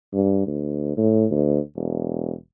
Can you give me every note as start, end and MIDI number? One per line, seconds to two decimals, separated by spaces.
0.13 0.42 43
0.47 0.94 38
0.97 1.26 45
1.31 1.59 38
1.76 2.33 28